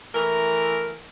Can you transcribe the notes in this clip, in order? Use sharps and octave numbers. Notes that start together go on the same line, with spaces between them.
E3 A3 A#4